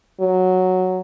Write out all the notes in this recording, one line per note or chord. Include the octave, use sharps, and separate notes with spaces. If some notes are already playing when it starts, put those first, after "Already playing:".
F#3